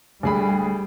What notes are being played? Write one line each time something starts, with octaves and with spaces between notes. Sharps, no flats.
D2 G3 G#4 B5